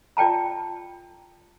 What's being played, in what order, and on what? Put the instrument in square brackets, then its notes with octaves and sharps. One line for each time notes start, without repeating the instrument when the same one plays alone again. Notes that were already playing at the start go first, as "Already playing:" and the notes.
[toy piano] F4 D5 G5 A5 A#5